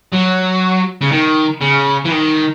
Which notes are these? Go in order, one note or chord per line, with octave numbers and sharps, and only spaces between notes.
F#3
C#3
D#3
C#3
E3
D#3